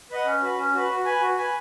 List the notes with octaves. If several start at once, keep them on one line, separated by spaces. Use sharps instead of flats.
B4 D#5 F#5
C#4
F#4 B4
C#4
F#4 B4
F#4
B4 G#5
F#4
B4 G#5